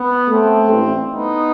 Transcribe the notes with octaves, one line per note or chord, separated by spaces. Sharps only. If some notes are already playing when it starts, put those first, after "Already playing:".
Already playing: B3
A3 C4
A1 G2 E3 A3
B3 D#4